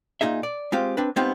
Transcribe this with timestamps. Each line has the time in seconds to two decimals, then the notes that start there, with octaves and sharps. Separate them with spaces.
0.21 A#2 D#4 G#4 E5
0.43 D5
0.72 G#3 C4 F4 G4
0.97 C4 D4 B4
1.16 G#3 B3 C4 D#4 F4 G4